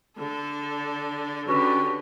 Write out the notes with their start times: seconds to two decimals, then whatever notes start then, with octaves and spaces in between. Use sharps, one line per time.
0.18 D3 A4
1.48 D3 C#4 F#4 G4 B4